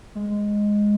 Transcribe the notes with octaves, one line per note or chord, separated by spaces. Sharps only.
G#3